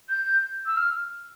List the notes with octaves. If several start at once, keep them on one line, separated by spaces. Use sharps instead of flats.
G6
E6
F6